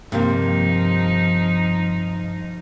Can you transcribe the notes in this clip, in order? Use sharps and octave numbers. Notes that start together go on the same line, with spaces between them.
G2 C3 F3 A#3 D#4